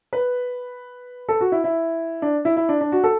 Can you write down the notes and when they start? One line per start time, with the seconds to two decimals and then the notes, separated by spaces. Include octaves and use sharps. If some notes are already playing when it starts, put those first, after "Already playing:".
0.13 B4
1.29 A4
1.41 F#4
1.52 E4
1.64 E4
2.22 D4
2.45 E4
2.57 E4
2.69 D4
2.81 D4
2.92 F#4
3.04 A4